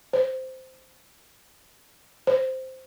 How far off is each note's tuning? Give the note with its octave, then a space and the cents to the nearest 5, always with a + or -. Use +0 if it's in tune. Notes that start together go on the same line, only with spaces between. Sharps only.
C5 -10
C5 -5